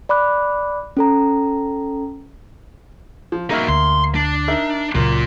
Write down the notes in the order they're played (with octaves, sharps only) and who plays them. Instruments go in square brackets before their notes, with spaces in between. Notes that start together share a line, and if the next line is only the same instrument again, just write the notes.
[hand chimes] D5 B5 D6 F#6
C#4 A4 A#5
[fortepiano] F3
[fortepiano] A#3 E5 F6 [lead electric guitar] D#4 F#4
[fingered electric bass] D2 [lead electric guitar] C6
[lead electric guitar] D4
[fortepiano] D#4 A#4 E5
[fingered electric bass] C#2 A#2 C#3 [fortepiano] F#2 [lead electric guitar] F4 A#4